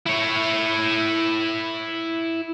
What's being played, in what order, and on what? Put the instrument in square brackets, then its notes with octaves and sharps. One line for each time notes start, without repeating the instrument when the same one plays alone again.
[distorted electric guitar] E4 C#5